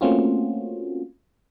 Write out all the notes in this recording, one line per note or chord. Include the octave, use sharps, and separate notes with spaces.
A3 A#3 C4 C#4 F4 F#4